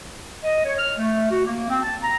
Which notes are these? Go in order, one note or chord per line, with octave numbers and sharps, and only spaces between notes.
D#5
C#5
F6
A3
F#4
A#3
C4
A5
A#5